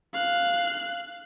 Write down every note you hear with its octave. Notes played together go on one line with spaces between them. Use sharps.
F5 F#6